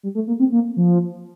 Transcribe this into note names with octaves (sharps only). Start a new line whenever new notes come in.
G3
A3
A#3
C4
A#3
F3